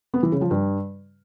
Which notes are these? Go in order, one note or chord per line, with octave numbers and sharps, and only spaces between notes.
B3
E3
C#3
F3
G2